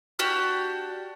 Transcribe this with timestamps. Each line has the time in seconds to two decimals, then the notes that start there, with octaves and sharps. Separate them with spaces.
0.19 D4 F#4 G4 F6